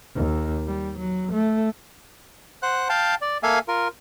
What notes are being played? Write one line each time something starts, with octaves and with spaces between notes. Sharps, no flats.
D#2
G3
F#3
A3
C5 F#5 F#6
F5 G5 A5
D5
A#3 A4 E5 F5 G#5
F4 A#4